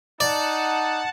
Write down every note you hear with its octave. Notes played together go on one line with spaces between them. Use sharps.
D#4 D5 F#5 A5